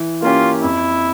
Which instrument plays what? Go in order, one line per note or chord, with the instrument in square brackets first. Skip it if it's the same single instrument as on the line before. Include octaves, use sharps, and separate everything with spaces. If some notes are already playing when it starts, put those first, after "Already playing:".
Already playing: [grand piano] E3
[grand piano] A#3 C#4 G4 [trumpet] F4
[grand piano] F2 [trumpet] E4